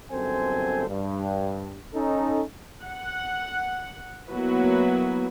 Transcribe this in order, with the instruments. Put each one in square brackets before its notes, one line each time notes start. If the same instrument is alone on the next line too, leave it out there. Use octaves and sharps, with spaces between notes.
[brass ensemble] G1 F#2 C4 A4 C5 G#5
G2
C#4 D#4 A4
[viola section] F#5
F#3 A#3 B3 E4 F#4 B4